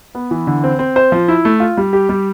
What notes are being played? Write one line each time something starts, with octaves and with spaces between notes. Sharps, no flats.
B3
E3
D3
C4
C4
C5
F3
E4
A3
F4
G3
G4
G3